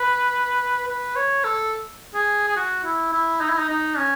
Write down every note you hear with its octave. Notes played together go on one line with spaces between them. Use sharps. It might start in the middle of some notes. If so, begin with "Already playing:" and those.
Already playing: B4
B4
C#5
A4
G#4
G#4
F#4
E4
E4
D#4
E4
D#4
D#4
C#4